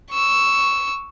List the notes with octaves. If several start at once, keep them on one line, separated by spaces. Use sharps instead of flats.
C#6 E6